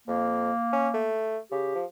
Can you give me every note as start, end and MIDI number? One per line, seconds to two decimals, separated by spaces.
0.08 0.51 41
0.08 1.11 58
0.73 0.89 61
0.94 1.38 57
1.51 1.70 49
1.51 1.82 67
1.75 1.85 53